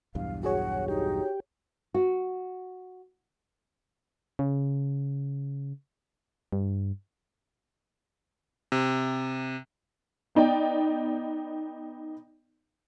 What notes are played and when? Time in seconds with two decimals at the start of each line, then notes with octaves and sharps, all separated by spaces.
0.15 B1 E2 G2 F5
0.43 F#4 G#4 C#5 F#5
0.88 D#4 G4
1.94 F#4
4.39 C#3
6.53 G2
8.72 C3
10.35 B3 D#4 D5 G5